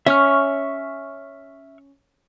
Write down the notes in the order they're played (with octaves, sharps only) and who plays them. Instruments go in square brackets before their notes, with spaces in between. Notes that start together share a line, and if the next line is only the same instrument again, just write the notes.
[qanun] C#4 [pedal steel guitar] E5 C#6 F6